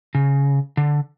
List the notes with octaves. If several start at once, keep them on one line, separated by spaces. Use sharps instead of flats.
C#3
D3